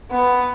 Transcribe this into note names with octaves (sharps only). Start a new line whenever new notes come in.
B3